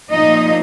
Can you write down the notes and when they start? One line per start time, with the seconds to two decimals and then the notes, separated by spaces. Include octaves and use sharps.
0.11 A#2 F3 A#3 D#4 D#5